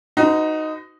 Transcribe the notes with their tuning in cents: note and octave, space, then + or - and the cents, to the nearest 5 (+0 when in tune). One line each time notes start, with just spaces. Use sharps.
D#4 +0 F#4 +0 B4 +45